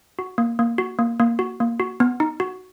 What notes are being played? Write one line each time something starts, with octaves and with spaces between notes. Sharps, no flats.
F#4
A#3
A#3
F#4
A#3
A#3
F#4
A#3
F#4
B3
D#4
F#4